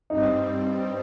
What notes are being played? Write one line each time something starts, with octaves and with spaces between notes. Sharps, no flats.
G2 G3 C4 D#4